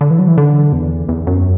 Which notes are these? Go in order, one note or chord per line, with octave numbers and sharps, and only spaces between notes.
D3
E3
F#3
E3
D3
E2
E2
F#2